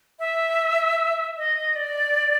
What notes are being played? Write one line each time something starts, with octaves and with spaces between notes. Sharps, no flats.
E5
D#5
D5